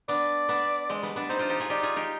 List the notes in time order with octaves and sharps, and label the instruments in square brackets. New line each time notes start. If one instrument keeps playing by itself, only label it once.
[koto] B3 D4 [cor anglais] D5
[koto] B3 D4
G#3 C4
G3 B3
B3 D4
[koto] C4 D#4 [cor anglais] C5
[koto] D4 F4
D#4 G4
F4 G#4
[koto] D#4 G4 [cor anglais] D5
[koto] F4 G#4
D#4 G4